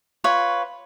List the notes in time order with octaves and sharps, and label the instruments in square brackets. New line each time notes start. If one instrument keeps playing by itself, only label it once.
[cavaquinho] F4 B4 C#5